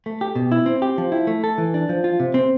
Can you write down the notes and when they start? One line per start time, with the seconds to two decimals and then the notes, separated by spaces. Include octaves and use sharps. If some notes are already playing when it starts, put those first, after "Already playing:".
0.06 A3
0.21 G4
0.35 B2
0.52 E4
0.66 C4
0.82 G4
0.98 F3
1.12 E4
1.27 A3
1.44 A4
1.58 E3
1.74 D4
1.89 F3
2.04 F4
2.20 C3
2.34 C4